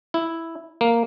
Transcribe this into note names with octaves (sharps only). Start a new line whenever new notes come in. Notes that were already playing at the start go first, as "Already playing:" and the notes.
E4
A#3